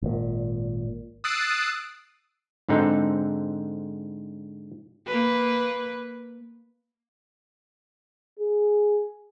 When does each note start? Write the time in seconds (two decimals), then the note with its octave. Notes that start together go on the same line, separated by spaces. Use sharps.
0.02 G#1 A#2
1.24 D#6 E6 F#6 A6 C7 D7
2.69 G#2 D3 C4 D#4 A4
5.07 A#3 B4
8.39 G#4